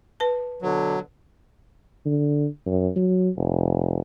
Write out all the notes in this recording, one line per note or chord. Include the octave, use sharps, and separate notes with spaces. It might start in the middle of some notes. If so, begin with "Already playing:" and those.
B4 A5
B2 D3 F#3
D3
F#2
F#3
F1